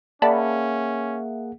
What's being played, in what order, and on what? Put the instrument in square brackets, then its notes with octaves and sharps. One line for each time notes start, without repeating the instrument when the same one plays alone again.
[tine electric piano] A#3 G#4 F#5 [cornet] C#4 [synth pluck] D5 A5 B5 [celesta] E5